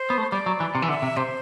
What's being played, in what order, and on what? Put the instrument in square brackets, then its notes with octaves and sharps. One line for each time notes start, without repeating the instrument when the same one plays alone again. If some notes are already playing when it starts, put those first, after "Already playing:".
Already playing: [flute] C5
[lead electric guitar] B3
A3
[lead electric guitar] G3 [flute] D5
[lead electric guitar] F#3
E3
C3
E3
[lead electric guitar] D3 [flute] E5
[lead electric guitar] C3
[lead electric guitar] C3 [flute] C5